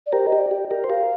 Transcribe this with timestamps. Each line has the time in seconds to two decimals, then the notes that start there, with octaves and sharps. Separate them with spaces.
0.06 D5
0.12 G4 A#4 C5
0.27 D#5
0.32 G4
0.39 D5
0.51 G4
0.71 G4 A#4
0.84 C5
0.89 G4 A#4 F5